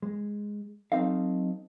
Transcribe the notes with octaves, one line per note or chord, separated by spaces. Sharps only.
G#3
F#3 C4 D#4 A4 F5